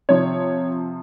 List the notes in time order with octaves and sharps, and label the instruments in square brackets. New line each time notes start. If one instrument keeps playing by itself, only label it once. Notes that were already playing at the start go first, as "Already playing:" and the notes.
[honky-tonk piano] C3 F3 C#5